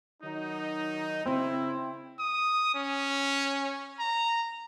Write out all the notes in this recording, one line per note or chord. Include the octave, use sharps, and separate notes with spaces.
D#3 F#3 D#4
C#3 C4 E4
D#6
C#4
A#5